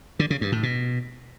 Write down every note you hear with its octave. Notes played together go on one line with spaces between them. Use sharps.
D3
C#3
G2
A2
B2